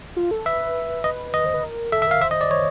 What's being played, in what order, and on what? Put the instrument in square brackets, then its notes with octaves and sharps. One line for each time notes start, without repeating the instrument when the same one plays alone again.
[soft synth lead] F4
A4
[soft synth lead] B4 [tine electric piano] E5
[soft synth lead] B4 [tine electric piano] D#5
[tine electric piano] D#5
[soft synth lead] C5
B4
A#4
[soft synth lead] A4 [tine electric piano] E5
[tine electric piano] E5
[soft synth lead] A#4 [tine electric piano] F5
[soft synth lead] C5 [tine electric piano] E5
[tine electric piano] D#5
D5
C#5